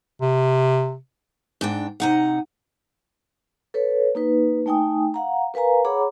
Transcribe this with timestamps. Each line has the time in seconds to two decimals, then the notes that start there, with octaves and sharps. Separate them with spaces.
0.21 C3
1.61 G#2 D4 G5
2.00 C3 D#4 F#5
3.74 A4 B4 C#5
4.15 A#3 D#4 B4
4.66 A3 D#4 G5 G#5 D#6
5.14 F5 F#5 A#5
5.54 A#4 B4 F5 G#5 A#5
5.85 G#4 C#5 F#5 A#5 B5 D6